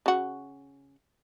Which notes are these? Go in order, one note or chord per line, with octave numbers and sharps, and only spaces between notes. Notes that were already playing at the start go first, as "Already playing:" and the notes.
C#3 F#4